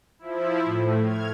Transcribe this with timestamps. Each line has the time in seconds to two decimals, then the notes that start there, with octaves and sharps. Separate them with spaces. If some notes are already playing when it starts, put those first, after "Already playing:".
0.19 F3 E4
0.64 A2
1.02 F6 G#6